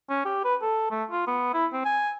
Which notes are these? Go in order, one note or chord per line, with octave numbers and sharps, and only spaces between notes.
C#4
G4
B4
A4
A3
F4
B3
E4
C4
G#5